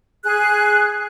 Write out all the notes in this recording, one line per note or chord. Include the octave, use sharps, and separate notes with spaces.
G#4 F#6